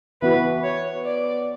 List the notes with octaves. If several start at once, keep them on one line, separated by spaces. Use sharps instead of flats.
E3 B3 F#4 B4
C#5
D5